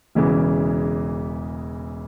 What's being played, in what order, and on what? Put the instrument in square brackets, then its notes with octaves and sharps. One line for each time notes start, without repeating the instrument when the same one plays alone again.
[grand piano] E1 E2 C#3 E3